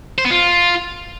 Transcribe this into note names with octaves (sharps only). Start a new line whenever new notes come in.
C5
B3
F4